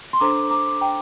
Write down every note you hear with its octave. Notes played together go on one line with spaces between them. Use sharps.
C6
D4 A4 C5 A#5 D6
A#5 D6
G5 A#5